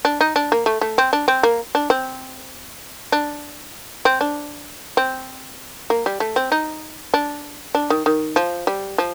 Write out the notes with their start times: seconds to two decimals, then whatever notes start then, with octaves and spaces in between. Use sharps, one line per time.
0.05 D4
0.21 D#4
0.36 D4
0.52 A#3
0.66 A3
0.81 A3
0.98 C4
1.13 D4
1.28 C4
1.43 A#3
1.75 D4
1.90 C4
3.12 D4
4.05 C4
4.21 D4
4.97 C4
5.90 A#3
6.06 G3
6.20 A3
6.36 C4
6.52 D#4
7.14 D4
7.75 D4
7.90 D#3
8.06 D#3
8.36 F3
8.67 G3
8.98 F3